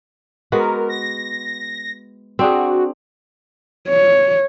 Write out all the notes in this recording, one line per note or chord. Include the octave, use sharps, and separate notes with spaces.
G#3 B3 F#4 A#4
A#6
C4 D4 F#4 G#4
C#5